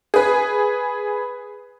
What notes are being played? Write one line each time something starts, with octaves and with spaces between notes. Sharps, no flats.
G#4 B4